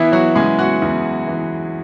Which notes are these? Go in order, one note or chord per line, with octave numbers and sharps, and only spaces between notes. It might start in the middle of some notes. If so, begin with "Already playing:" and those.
Already playing: E3 B3 E4
F#3 F#4
C#3 G#3 G#4
F#4 F#5
E2
E3